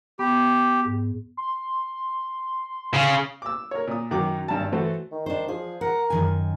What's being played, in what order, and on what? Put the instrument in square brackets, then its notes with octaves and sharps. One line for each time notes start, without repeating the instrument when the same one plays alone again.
[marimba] B3 [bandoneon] G4
[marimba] G#2
[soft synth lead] C6
[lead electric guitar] C#3
[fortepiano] D6 E6
A#4 C#5
A#2 D#6
F#2 D#3 F#3 D6
G#1 G2 A5
E3 A3 F#4 A4 C5
[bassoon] D#3
[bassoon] D#3 [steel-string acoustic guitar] D4 C5
[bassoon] F3 [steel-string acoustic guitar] G#4
[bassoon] A#4 [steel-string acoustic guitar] F#5
[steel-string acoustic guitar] F#2 D#3 G#5